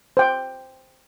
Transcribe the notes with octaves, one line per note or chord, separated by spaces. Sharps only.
C5 G5